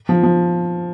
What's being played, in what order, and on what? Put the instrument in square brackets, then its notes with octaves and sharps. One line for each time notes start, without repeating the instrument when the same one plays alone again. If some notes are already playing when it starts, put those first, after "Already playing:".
[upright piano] F3
F3